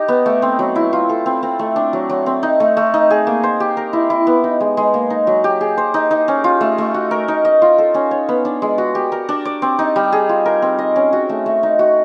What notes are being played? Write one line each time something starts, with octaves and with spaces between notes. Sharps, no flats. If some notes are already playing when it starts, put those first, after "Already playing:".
Already playing: D#4 G4
B3
A3
C4
F#3
E4
F4
A4
C4
C4
A3
D4
F#3
F#3
C4
D#4
A3
A3
D#4
G#4
A#3
C5
G4
A#4
E4
E4
B3
D#4
G#3
G#3
A#3
D#4
F#3
G4
G#4
C5
D#4
D#4
C#4
F4
A3
A3
F#4
A#4
D#4
D#5
F4
A4
C#4
C#5
B3
D4
G#3
F#4
G4
A#4
D4
D5
C4
D#4
G3
G#4
F4
A#4
C4
D#5
C#4
F#4
A3
A3
D#4
F#4